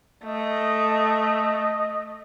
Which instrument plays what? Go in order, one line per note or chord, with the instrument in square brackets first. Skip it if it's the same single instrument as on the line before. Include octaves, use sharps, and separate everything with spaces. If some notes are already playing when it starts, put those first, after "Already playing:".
[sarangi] A3 [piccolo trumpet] D#5